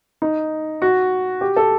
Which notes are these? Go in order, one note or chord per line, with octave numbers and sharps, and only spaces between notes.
D#4
F#4
G4
A4